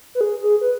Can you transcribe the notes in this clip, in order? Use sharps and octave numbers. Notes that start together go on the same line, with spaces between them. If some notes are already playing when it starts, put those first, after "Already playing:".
B4
G#4
G#4
B4